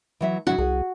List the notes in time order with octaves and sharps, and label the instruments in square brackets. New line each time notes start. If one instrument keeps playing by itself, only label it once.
[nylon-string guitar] E3 F#3 E5
[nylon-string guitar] C#3 F#3 E4 [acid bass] D4 [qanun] F#4
[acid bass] C2 [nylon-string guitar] G#4